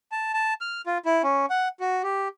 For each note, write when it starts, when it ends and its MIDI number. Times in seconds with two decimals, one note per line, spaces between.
0.12 0.33 81
0.33 0.54 81
0.61 0.82 89
0.86 0.98 65
1.05 1.22 64
1.23 1.46 61
1.50 1.68 78
1.80 2.02 66
2.03 2.28 67